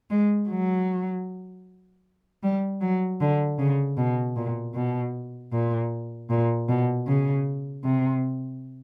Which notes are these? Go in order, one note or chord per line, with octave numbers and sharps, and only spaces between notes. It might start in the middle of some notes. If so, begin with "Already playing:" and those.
G#3
F#3
G3
F#3
D3
C#3
B2
A#2
B2
A#2
A#2
B2
C#3
C3